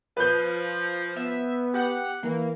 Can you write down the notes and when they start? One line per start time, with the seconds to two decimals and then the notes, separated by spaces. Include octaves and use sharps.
0.17 F3 B4 G6
1.17 B3 E5
1.74 G4 F#5
2.23 E3 A#3